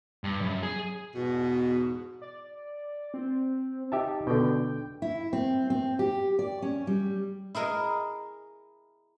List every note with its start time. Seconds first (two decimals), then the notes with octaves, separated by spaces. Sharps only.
0.24 G2
0.41 F#2
0.63 G#4
1.15 E2 G#2 B2
2.22 D5
3.14 C4
3.92 D#4 G4 E5 A5
4.27 B2 D3 G5
5.02 E4
5.33 C4
5.70 C4
5.99 G4
6.39 D5
6.62 C#4
6.87 G3
7.55 E4 G#4 A#4 D#5